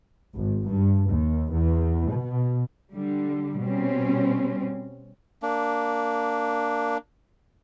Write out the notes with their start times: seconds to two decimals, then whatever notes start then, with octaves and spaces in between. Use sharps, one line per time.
0.35 G#1
0.69 G2
1.10 D#2
1.53 E2
2.11 B2
2.94 D3 G3
3.61 B2 G3 C4 C#4
5.43 A#3 D4